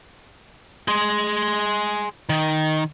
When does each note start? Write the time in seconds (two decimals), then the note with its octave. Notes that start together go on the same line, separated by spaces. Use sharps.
0.88 G#4 C6
2.29 D#3